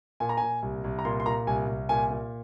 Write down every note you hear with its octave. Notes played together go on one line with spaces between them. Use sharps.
A#2 G#5
A#5
A#2 G#5
C2
C2
A#5
A#2 C6
C6
A#2 A#5
C2 G#5
C2
A#2 G#5
A#2